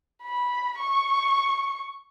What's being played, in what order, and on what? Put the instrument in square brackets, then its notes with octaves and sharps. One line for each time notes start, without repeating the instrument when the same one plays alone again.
[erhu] B5
C#6